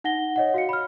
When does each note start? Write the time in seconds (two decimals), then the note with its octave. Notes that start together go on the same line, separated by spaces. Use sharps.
0.04 D#4 F#5 A#6 G7
0.36 C#5 D#5 F#5
0.54 F#4 F5 C#7
0.69 B5 F6